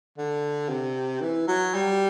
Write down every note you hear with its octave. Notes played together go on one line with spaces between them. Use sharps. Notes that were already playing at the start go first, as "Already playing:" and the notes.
D3
C3
E3
F#3
G3